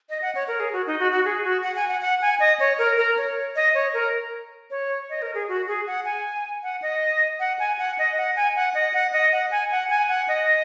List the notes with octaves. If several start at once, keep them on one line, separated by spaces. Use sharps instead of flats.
D#5
F#5
C#5
A#4
G#4
F#4
D#4
F#4
F#4
G#4
F#4
F#5
G#5
F#5
F#5
G#5
D#5
C#5
A#4
A#4
C#5
D#5
C#5
A#4
C#5
D#5
A#4
G#4
F#4
G#4
F#5
G#5
F#5
D#5
F#5
G#5
F#5
D#5
F#5
G#5
F#5
D#5
F#5
D#5
F#5
G#5
F#5
G#5
F#5
D#5